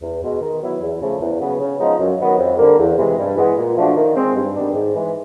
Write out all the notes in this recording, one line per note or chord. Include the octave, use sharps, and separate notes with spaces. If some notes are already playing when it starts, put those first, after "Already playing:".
E2
B2 G#3
D#3
F#3 B3 E4
E2
C#3 F3 A3
E2
C#3 F#3 B3
C#3
F3 G#3 B3 D#4
F#2
D#3 F#3 B3
F2
D3 G3 A#3
E2
C3 E3 G#3
G2
E3 G#3 B3 E4
A#2
F3 A3 D4 F#4
D#3
G#3 C4
G2
D#3 G3 B3 D4
G#2
E3 G#3